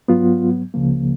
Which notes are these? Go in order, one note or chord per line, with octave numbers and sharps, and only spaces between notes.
G#2 F#3 B3 F4
C#2 C#3 F3 A#3